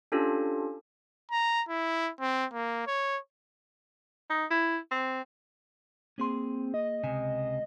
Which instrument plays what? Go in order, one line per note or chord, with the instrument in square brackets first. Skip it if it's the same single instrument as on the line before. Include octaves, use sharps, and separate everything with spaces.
[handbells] C#4 D4 F4 G4 A4
[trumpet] A#5
E4
C4
A#3
C#5
[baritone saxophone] D#4
E4
C4
[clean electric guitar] A#3 G#4 C6 [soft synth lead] C4
[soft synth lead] D#5
[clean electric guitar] C#2 C3 G#5